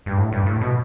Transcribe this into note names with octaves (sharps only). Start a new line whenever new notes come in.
G2
A2
G2
A2
B2